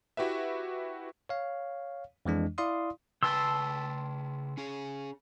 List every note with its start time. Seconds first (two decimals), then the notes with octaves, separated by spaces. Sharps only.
0.17 E4 F#4 G4 B4 E5
1.29 C#5 F5
2.25 F2 E3 G#3 D4
2.58 E4 D5 F5 C6 D#6
3.23 C#3 B4 G5 A5 C6 E6
4.57 C#4 G#4